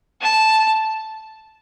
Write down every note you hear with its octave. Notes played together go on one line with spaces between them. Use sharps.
A5